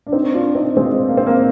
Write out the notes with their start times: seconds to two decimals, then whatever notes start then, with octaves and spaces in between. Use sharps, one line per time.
0.07 D4
0.12 C4 D#4
0.34 D4 F4
0.55 C4 D#4
0.77 G#3 C4
1.09 A#3
1.17 C4
1.26 A#3